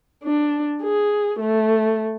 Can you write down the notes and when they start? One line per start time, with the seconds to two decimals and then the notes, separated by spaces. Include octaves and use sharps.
0.24 D4
0.83 G#4
1.40 A3